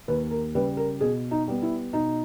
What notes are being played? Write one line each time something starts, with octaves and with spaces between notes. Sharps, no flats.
D#2 B4
A#4
C#3 G3 B4
A#4
B2 G#4
D#4
G3 B3
E4
B2 D#4